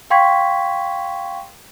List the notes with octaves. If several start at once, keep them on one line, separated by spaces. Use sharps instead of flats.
F5 G5 C6 C#6 G#6 B6